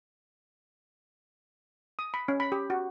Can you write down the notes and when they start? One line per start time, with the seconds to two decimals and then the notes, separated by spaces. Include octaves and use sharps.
1.99 D#6
2.14 B5
2.28 C#4
2.40 B5
2.52 G4
2.70 F#4